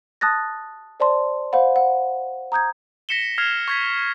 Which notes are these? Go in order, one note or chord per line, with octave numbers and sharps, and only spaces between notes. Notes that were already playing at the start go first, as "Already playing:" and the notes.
A5 D#6 F#6 A6 A#6
C5 D5 A5 C6
C5 F5 F#5 B5
F#5
A#5 D#6 G6 G#6
A#6 B6 C#7 E7 G7
F6 G#6 C7 F7
C#6 G#6 B6